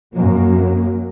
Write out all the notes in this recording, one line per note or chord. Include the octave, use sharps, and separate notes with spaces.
F#2 F#3 A#3